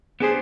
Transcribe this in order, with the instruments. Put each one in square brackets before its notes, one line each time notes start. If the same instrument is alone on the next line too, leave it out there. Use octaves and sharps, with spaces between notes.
[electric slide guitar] B3 D4 G4 C5 [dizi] G#4